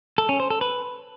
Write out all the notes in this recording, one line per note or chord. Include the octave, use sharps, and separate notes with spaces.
A4
C#4
C5
A4
B4